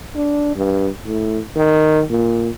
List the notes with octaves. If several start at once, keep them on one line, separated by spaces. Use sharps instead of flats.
D4
G2
A2
D#3
A#2